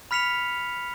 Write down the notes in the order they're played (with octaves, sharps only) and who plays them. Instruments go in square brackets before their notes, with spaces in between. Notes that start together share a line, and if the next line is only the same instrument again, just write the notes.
[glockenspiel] B5 F6 B6 C#7 F7